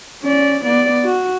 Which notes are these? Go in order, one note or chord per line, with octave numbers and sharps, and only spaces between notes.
C#4 D5
B3 D5
F#4